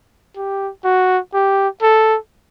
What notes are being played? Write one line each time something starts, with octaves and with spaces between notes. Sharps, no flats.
G4
F#4
G4
A4